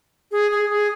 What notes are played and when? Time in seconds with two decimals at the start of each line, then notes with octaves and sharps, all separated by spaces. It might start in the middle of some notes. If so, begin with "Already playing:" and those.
0.32 G#4
0.51 G#4
0.70 G#4